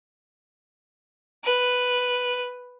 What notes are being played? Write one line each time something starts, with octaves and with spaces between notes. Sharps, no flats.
B4